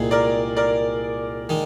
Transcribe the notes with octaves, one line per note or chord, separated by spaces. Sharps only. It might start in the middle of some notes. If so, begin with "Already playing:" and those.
Already playing: C2 A#2 G#3 C4 G#4
A#4 D5
A#4 D5
D#3 G#3